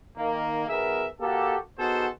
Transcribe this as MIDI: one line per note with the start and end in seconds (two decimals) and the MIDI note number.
0.18 0.65 51
0.18 0.65 58
0.68 1.07 35
0.68 1.07 59
0.68 1.07 68
0.68 1.07 70
0.68 1.07 76
1.21 1.57 58
1.21 1.57 66
1.21 1.57 67
1.21 1.57 69
1.79 2.07 59
1.79 2.07 63
1.79 2.07 66
1.79 2.07 68
1.79 2.07 69
1.79 2.07 72